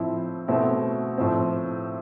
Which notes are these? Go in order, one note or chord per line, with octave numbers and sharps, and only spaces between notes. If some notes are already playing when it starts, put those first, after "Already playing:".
Already playing: A2 F3 C4 E4
B2 A3 C4 E4
A2 F3 C4